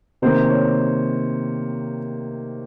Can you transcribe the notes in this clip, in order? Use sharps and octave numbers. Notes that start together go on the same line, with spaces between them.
C3 D#3 A#3 C5
C#5